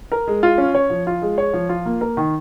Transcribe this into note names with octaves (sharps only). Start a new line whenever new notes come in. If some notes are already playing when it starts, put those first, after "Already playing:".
A#4
G#3
F4
C#4
C#5
F3
F4
G#3
C#5
F3
F4
A#3
A#4
D#3